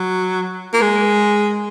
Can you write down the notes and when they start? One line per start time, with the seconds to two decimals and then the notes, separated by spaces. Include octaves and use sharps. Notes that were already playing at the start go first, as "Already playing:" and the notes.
Already playing: F#3
0.73 A#3
0.82 G#3